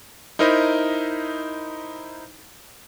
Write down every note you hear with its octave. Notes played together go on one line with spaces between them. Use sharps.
D#4 E4 A#4 C5 D#5 B5